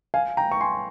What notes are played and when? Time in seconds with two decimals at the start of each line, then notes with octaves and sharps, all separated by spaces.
0.14 F5 G#5
0.37 G5 A#5
0.51 C#6
0.61 G#5 C6